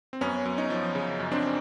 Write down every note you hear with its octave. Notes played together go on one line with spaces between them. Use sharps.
C4
F#2 B3 C#4
F#2
C#4 D#4
F3
C#3
F#2
C4 D4